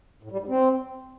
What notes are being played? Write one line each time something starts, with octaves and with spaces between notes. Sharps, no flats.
A2
G3
G#2
C4